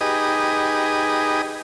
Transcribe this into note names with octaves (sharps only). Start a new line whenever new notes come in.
D#4 G4 G#4 B4 D#5